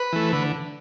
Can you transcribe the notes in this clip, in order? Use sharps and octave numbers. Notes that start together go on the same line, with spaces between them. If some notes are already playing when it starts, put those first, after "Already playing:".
Already playing: B4
E3 A3
D3 B4